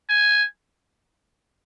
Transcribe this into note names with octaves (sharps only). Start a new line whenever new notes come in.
G#5